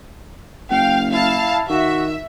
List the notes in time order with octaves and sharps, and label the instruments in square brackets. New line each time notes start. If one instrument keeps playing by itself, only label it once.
[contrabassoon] F#1 [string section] F5 [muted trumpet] G5
[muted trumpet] E4 [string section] F5 A5
[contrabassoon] D#3 [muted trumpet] F#4 [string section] E5